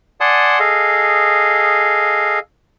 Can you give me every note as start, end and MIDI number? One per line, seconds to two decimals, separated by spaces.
0.21 0.59 74
0.21 0.59 78
0.21 0.59 80
0.21 0.59 81
0.21 0.59 84
0.21 0.59 87
0.59 2.39 68
0.59 2.39 69
0.59 2.39 75
0.59 2.39 77